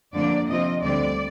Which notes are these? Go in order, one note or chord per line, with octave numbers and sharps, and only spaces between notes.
F2 D3 F3 A#3 D4 D5
C3 F3 C4 F4 D#5
D2 D3 G3 C4 D5